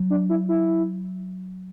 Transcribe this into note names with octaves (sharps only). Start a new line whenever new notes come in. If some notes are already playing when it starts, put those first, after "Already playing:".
Already playing: F#3
D4
E4
E4